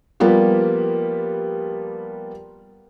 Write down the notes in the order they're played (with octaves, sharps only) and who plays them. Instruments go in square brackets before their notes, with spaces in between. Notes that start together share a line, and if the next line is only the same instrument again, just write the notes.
[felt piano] F3 G3 A#3 B3 F4 G4